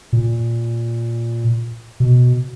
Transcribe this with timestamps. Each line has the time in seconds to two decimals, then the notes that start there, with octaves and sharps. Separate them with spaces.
0.13 A#2
2.00 B2